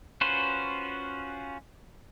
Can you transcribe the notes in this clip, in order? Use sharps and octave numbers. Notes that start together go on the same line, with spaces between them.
C#4 F4 F#4 B4 C5